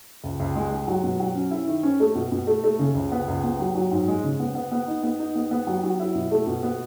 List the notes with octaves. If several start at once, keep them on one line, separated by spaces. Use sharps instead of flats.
C#2
C#2
G#3
G#3
F#3
B2
F#3
C#4
E4
D#3
C#4
A3
B2
B2
A3
A3
C#3
C#2
B3
C#2
B3
F#3
F#3
G#2
G#3
C#3
B3
B3
B3
D#4
B3
D#4
B3
B3
F#3
F#3
E4
B2
A3
B2
B3